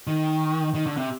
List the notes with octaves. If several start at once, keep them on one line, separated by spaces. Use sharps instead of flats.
D#3
D#3
D3
C3